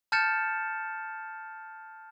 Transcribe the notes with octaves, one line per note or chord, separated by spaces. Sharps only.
A5 F6 G6 A6 C#7 E7